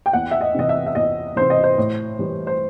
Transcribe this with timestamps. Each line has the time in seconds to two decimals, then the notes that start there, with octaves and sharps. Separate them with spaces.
0.06 G5
0.13 E2 F#5
0.31 E5
0.41 D#5
0.55 C3 E3 D#5
0.69 E5
0.86 E5
0.95 E2 D#5
1.36 C3 E3 C5
1.50 D#5
1.63 C5
1.78 A2
2.19 E3 G3
2.47 C5